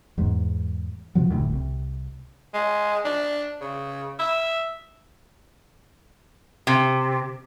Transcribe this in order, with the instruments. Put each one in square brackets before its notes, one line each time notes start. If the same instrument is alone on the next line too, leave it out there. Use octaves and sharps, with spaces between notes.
[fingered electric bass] E2 G#2
C3 F3 F#3
F1 D2 A2
C2
[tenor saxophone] G#3
D4
C#3
E5
[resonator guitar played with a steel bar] C3